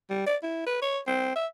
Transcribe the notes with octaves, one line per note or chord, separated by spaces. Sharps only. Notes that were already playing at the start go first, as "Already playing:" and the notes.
G3
D5
E4
B4
C#5
C4
E5